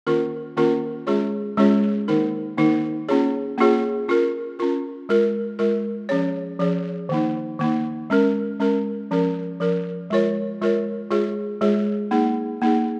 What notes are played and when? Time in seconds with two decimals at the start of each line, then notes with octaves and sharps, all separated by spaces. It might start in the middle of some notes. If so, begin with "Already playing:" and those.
0.07 D#3 A#3 C#4 F4 A#4
0.57 D#3 A#3 C#4 F4 A#4
1.07 G#3 C#4 F4 G#4 C#5
1.57 G#3 C#4 F4 G#4 C#5
2.08 D#3 A#3 D#4 A#4
2.57 D#3 A#3 D#4 A#4
3.09 A#3 C#4 F4 G#4 C#5
3.58 A#3 C#4 F4 G#4 C#5
4.08 C#4 F4 A#4
4.59 C#4 F4 A#4
5.09 G#3 F4 A#4
5.59 G#3 F4 A#4
6.09 F3 C#4 G#4 C#5
6.59 F3 C#4 G#4 C#5
7.09 D#3 A#3 D#4
7.59 D#3 A#3 D#4
8.10 G#3 C#4 A#4
8.60 G#3 C#4 A#4
9.11 F3 C#4 A#4
9.60 F3 C#4 A#4
10.10 G#3 F4 A#4 C#5
10.61 G#3 F4 A#4 C#5
11.11 G#3 F4 G#4 C#5
11.61 G#3 F4 G#4 C#5
12.11 A#3 D#4 G#4
12.62 A#3 D#4 G#4